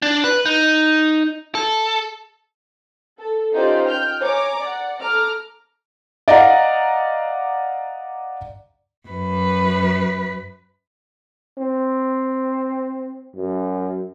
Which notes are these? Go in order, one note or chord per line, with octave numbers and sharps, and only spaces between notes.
D4
B4
D#4
A4
A4
C#4 D#4 F4 G4 C5 D5
G5 F6 G6
C#5 G#5 A#5 D6
D5 F#5
A4 A#5 D6 F6
D5 D#5 F5 F#5 A#5
F#2 B4
C4
F#2